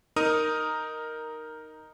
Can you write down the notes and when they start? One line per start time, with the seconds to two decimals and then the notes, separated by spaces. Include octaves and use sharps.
0.16 D#4 A#4 D#6 D#7